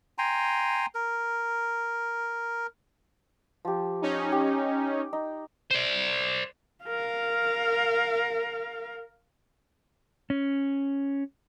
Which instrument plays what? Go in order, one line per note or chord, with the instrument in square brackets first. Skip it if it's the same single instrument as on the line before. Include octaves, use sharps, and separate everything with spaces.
[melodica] G5 G#5 A#5 C6
A#4
[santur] F3 G4
[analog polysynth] C#4 D#4
[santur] G4
D#4
[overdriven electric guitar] C5 D5
[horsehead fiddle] A#4 F5
[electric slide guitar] C#4